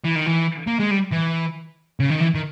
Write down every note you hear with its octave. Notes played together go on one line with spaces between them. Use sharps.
E3
D#3
E3
A#3
G#3
G3
E3
C#3
D#3
E3
D#3